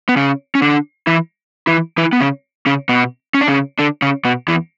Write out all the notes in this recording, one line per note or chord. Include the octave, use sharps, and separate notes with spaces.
B3
C#3 C#4
C#4
D3 D4
E3 E4
E3 E4
E3 E4
B3
C#3 C#4
C#3 C#4
B2 B3
C#4
D4
C#3 C#4
D3 D4
C#3 C#4
B2 B3
E2 E3